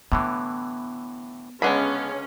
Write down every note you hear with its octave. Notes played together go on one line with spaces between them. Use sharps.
A2 D3 E3 B3
C#2 D3 G#3 B3 C#4 G#4 B5